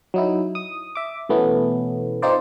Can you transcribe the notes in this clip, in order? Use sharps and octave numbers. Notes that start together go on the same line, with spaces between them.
F#3 D#4 E4
D#6
E5 D6
B2 E3 A3 B3 C#4 E4
C4 D#4 F4 C5 D5